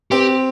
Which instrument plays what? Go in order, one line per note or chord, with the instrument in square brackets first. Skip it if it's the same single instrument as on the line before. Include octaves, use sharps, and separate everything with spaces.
[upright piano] C4 [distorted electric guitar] G4